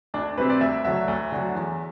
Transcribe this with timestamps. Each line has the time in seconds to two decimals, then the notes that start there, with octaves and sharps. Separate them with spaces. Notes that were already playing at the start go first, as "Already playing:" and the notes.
0.14 D2 D4
0.37 C3 G3 C4 B4
0.50 D5
0.61 D2 E5
0.84 D3 F#3 E5
1.08 D2
1.32 D3 F#3
1.55 E2